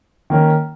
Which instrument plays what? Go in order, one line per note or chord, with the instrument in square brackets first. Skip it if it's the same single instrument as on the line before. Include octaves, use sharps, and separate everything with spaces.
[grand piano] D#3 A#3 C#4